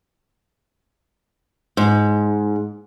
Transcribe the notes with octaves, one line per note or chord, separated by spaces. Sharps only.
G#2